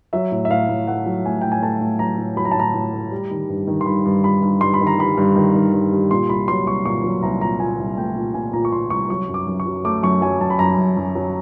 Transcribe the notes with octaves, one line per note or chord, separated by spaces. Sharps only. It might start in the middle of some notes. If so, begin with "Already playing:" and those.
F#3 E5
A2
E5
A2 F5
A2
A3 F#5
F#3
A3 G#5
A2 G5
G#5
A3 A5
A2
F#3 A#5
A2
F#3 B5
A#5
A5
A2 A#5
A2
A3
G3
D#3
G2
D#3
C6
G2 B5
G2
G3 B5
G2
G2 C6
B5
D#3
A#5
G3 B5
G2
D#3
D#3
G2
G3
A#2 C6
C2 B5
F#3 C6
C2 C#6
A#2 C#6
F#3
C2 A#5
A#2 A#5
A#2 G#5
C2
A3 G5
A#2
A#2 G#5
A#2 A#5
C#6
A#2 C6
C2 C#6
F#3 C#6
F#2
D6
F#2
C#6
F#3
A3 D6
F#2 C#6
F#3 G#5
F#2 A5
B5
F#2 A#5
F#2
F#2
F#3